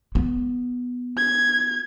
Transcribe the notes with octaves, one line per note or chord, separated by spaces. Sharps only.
B3
G#6